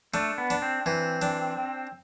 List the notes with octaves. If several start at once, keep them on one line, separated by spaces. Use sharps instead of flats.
A3 D4
B3
D4
C4
E3 C4
D4